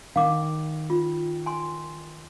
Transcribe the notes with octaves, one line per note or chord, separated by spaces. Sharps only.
D#3 F5 D6
F4
G#5 C6